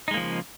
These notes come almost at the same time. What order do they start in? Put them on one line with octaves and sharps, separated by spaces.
D#4 G#3 A#3 F3 C#3